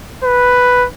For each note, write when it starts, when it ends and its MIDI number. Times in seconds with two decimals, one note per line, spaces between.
0.24 0.87 71